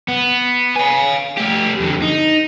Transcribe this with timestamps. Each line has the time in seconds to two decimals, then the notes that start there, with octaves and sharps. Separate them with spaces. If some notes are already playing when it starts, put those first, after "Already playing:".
0.08 B3
0.76 F5 G#5
1.37 A3 G4
1.80 F2 D3
2.02 D#4